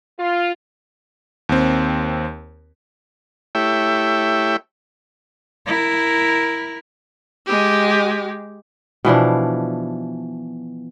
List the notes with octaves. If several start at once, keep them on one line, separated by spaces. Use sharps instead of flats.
F4
D#2 C4
A3 E4 G4 C#5 E5 G5
E4 A#4
G#3 G4
B2 E3 F3 D4